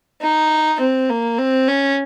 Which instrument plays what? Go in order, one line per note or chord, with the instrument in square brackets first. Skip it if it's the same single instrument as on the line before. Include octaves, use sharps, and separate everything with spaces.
[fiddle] D#4
C4
A#3
C4
C#4